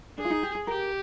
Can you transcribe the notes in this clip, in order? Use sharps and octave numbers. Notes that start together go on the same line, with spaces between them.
D4 G#4
F4
D#4
G4
G#4
G4 A#4